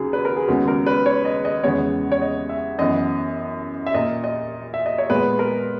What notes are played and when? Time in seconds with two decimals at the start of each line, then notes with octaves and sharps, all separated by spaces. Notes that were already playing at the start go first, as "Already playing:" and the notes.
Already playing: D#2 C#3 F#3 F#4 G#4
0.13 B4
0.25 A#4
0.36 G#4
0.48 D#2 C#3 G#3 B3 F#4
0.68 A#4
0.86 B4
1.06 C#5
1.25 D#5
1.45 D#5
1.63 E2 C#3 G#3 B3 C#5
2.12 C#5
2.22 D#5
2.49 E5
2.78 F#2 E3 B3 D#5
3.86 E5
3.94 A#2 A#3 D#5
4.24 D#5
4.74 E5
4.86 D#5
4.98 C#5
5.10 A#2 G#3 B3 B4
5.39 A#4